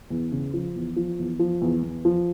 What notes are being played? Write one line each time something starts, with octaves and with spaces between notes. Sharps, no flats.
E2
C#3
F3
E2
F3
E2
F3
E2
E2
F3